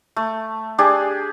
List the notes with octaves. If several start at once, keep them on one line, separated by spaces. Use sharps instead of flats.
A3
D4 G4 G#4